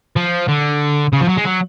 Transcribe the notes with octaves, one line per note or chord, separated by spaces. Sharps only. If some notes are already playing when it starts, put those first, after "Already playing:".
F3
D3
C#3
F3
F#3
G#3
F#3